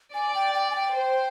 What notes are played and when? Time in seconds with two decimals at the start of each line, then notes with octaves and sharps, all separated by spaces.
0.14 D5 G#5
0.35 G5
0.55 G5
0.70 G#5
0.75 G5
0.95 C5